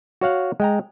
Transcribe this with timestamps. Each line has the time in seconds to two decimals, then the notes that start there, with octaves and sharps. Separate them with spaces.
0.21 F#4 C#5 F5 F#5
0.60 G#3 G5 A#5